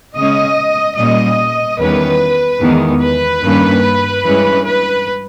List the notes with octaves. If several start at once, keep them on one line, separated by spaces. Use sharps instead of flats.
C#3 G#3 C#4 D#5
A#2 G3 C#4 D#5
E2 D#3 G3 C#4 B4
E2 D#3 G#3 B3
B4
G2 D#3 A#3 C#4
G2 E3 G#3 C#4
B4